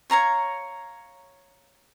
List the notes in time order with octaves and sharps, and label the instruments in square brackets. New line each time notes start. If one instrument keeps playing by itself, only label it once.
[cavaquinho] C#5 F5 A#5 C#6